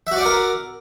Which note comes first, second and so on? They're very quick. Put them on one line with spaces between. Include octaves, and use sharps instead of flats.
E5 F#4 D5 F#5 A#4